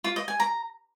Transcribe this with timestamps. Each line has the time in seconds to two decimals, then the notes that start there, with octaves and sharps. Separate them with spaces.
0.04 F4
0.16 D#5
0.28 G#5
0.40 A#5